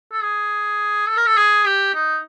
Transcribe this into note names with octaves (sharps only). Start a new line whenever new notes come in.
A4
G#4
A4
A#4
A4
G#4
G4
D#4